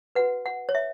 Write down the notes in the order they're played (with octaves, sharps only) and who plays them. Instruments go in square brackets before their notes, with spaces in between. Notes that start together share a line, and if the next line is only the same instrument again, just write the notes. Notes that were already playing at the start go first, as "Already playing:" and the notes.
[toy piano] F#4 B4 F#5
F#5
C#5
E5